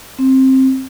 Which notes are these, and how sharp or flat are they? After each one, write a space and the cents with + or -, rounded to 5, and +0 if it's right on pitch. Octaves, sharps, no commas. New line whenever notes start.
C4 +15